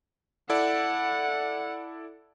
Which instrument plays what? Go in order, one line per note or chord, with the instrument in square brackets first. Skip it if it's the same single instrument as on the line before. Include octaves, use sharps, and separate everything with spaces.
[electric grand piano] E4 A4 D5 [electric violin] F#5